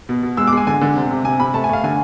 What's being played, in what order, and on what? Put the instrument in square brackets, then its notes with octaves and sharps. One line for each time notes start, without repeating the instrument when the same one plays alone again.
[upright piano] B2
B2
G#3 E6
D6
G#3 G#5
D3 G#5
D3
C3
C3
C3 G#5
C3 B5
A3 A5
G#5
A3 F5
D3 G#5